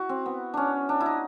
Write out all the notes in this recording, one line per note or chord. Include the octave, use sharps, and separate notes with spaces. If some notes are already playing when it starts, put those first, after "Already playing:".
Already playing: E4 F#4
C4
B3
C#4 D4
D4
E4
D#4